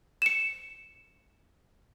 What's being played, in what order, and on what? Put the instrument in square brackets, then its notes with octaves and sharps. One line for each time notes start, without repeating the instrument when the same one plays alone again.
[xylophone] C#7 E7